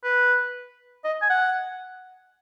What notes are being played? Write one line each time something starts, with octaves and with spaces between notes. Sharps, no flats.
B4
D#5
G#5
F#5